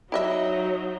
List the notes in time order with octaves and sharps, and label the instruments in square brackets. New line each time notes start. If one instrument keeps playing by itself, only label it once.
[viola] F#3 D#4 [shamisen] E4 D#5 E5